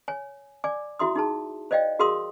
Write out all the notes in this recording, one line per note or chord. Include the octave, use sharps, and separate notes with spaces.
C#5 G#5
D5 G#5 D6
E4 F#4 E5 C6 D#6
D#4 G#4 A5
C5 D5 D#5 F5 G5
F#4 G#4 A#4 F5 C6 D#6